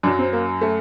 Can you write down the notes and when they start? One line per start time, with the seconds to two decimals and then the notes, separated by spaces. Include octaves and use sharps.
0.03 F#2 D4
0.07 F#3
0.19 C4
0.33 A#3
0.61 A3